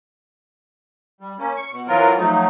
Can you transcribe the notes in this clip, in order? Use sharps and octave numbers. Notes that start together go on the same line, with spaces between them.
G3
A#3 C#4
C#6
B2
E3 F#3 C4 F4 A#4
F3 F#3 A3 D#4